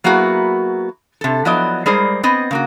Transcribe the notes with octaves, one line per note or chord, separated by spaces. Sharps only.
F#3 A#3 B3 E4 F#4 G#4
C3 A4
F3 F#3 B3 E4 D5 D#5
G3 G#3 G#4 A#4 C5 D5
B3 C4 D#5
C#3 A#3 F#4